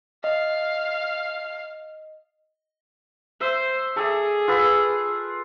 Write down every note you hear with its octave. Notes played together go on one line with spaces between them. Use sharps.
D#5 F5
C5 E5
G#4 A4 D5 E5
F4 B4 E6